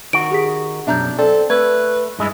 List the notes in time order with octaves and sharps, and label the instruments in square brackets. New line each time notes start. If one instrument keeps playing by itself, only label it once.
[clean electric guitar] D#3 F#4 [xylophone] D7
[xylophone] G4 G#4 B6
[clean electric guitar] F#2 B2 [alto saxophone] D4 [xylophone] E5 A#5 G6
[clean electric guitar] C4 [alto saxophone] A4 [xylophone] D5
[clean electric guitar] A3 [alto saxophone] B4 [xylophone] G#6
[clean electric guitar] G2 G#3 E4